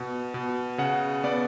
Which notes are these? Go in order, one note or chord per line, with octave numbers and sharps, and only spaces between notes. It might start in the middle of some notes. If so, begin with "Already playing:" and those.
Already playing: B2
B2
C#3 F#5
B3 D5